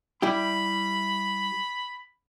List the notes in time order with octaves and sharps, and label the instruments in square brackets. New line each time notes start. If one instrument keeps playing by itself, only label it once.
[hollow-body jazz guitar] G3 E4 G4 [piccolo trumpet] B5